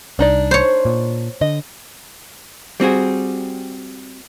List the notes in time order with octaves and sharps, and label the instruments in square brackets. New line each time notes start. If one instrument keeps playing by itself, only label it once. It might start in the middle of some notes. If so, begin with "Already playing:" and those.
[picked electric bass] C2 [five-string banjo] D4 D#4 D5
[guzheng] C5 C#5
[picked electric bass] A#2
[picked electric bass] D3 [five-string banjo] D#5
[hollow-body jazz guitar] G3 C4 F#4 G#4